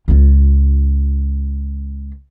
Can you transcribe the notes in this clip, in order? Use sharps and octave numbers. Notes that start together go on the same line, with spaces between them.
C#2 F4